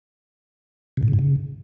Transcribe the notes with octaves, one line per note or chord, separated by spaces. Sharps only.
C3
A2
C#3
G#2
C#3